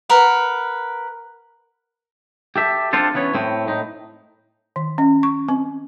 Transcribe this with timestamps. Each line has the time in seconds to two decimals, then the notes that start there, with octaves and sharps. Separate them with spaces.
0.09 A#4 B4 F#5
2.56 G4 A4 E5
2.93 C4 D4 F4 A4 C5
3.14 E3 B3 C#4 C#5
3.34 A2 C4
3.68 A2 D#4
4.76 D#3
4.98 C#4
5.23 C#6
5.48 C4